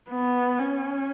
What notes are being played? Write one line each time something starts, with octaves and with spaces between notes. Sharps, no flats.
B3
C#4